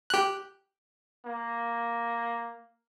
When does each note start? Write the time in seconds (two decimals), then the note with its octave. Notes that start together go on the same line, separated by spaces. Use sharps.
0.10 G4 F#6
1.25 A#3